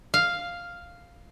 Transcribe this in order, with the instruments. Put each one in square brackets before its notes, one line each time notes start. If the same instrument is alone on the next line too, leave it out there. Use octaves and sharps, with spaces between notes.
[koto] F5